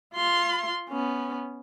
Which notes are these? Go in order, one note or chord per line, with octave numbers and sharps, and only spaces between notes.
F4 C6
B3 C#4